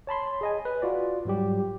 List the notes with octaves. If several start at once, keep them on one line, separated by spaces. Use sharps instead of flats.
C#5 A5 B5 C6
G#4 D#5 G#5
B4
F4 F#4 D5
G#2 F#3 G3 G4